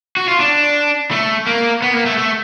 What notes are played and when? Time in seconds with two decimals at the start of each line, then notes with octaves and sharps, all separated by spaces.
0.17 F#4
0.28 F4
0.40 D4
1.11 A3
1.47 A#3
1.82 B3
1.94 A#3
2.06 A3
2.18 A3